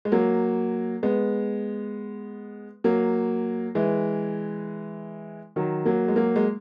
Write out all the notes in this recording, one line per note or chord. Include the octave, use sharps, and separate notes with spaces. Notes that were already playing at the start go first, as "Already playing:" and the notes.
G#3
F#3 A#3
G#3 B3
F#3 A#3
E3 G#3
D#3 F#3
F#3 A#3
G#3
F#3 A#3
G#3